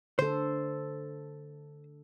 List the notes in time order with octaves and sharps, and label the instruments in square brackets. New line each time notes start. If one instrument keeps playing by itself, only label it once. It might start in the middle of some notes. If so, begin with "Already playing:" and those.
[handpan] D3 A4 [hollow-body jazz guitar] C5